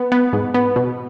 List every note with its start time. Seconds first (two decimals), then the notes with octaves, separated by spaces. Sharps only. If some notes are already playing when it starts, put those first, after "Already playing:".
Already playing: B3
0.12 B3
0.33 G#2
0.54 B3
0.76 B2